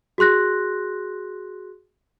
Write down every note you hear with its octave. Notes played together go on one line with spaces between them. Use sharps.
F#4 G#4 C6 F#6 A#6